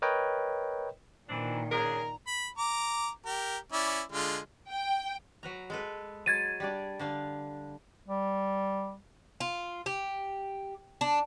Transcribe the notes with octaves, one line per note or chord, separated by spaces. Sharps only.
A#4 B4 C#5 D#5 G5
A#2 D#3 E3 C4 D4
C#3 D4 G#4 A#4 A#5
B5
A#5 D6
G4 A#4
C#4 E4 D5
D3 G#3 F4
G5
F#3 B4 A#5
G#3 A4 B4
F#3 G#3 G#6 A6 D#7
G3 D4 D5
D3 D4 F5
G3
F4
G4
D4